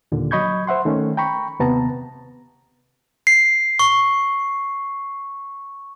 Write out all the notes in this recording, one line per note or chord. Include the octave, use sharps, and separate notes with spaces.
D#2 A#2 D3
F#3 D#5 B5 C#6 G6 G#6
C5 E5 F#5 C6
D#3 A3 C#4
G5 A#5 B5 C#6
D#2 C3 B3 A5 A#5
C7
C#6